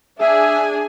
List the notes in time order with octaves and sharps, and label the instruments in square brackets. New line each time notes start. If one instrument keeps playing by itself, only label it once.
[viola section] D4 G#4 G#5 [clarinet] E5